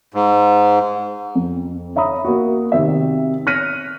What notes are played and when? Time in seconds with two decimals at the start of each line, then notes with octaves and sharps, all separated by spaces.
0.14 G#2
1.35 F2
1.96 C#5 E5 A#5 B5 D#6
2.25 A#3 F#4
2.72 C3 D#3 C4 E5
3.47 F6 F#6 A#6 B6 C#7 D#7